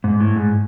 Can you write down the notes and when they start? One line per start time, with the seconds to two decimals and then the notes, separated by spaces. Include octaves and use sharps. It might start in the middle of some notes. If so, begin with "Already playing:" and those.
0.04 G#2
0.20 A2
0.36 G#2